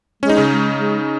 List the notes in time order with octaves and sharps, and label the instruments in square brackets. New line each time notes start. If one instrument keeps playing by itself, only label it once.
[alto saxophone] G#3 [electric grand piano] C#4
[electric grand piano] D#4
C#3 C#4
[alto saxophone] G#3
G#3